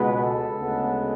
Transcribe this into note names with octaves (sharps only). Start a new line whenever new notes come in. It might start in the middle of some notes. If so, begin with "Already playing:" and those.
Already playing: C#2 B2 G#3 B3 B4
A4
D2 C#3 G#3 B3